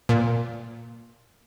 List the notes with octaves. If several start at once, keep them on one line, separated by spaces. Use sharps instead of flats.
A#2